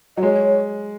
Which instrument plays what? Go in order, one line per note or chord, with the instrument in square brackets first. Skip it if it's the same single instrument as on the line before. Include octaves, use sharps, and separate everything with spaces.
[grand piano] F#3 [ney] D#5
[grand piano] G#3 [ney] C#5